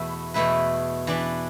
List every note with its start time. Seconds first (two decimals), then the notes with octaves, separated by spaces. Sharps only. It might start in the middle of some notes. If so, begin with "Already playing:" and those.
Already playing: E2 B2 A3 E4 B4
0.34 E2 B2 A3 E4 B4
1.07 E3 D4 B4 D5